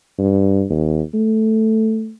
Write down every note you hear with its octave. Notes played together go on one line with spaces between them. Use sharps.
G2
D#2
A3